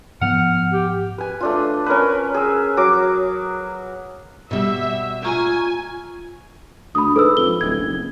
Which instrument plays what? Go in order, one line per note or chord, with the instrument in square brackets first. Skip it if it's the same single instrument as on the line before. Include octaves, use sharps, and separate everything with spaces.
[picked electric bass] G#2 F3 B3 [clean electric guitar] F#5 [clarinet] F6
[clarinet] G4
[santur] B4 G#5
A3 D4 F4
C#4 A#4 B4
G#4 E6
F#3 D6
[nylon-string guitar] B2 G3 [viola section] E5
[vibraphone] F4 A#5 C#6 [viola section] G#5
[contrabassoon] D2 [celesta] B5 D#6
[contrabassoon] G#2 [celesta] A4 B4 E6
[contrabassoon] F2 [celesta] G7
[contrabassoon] D1 [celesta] G#6
[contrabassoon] F#1